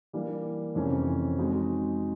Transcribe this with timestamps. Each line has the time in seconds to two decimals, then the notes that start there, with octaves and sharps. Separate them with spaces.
0.13 E3 G3 A#3 D4
0.75 F2 C3 E3 A3 C#4
1.38 G#3 C4 D#4 F#4